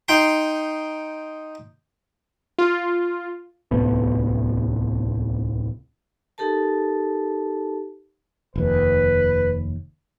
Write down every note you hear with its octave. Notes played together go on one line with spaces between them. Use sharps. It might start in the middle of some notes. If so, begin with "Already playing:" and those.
D#4 G5 C6
F4
D1 C2 A2 B3
D#4 G4 A4 A#4 A5
F1 D#2 B4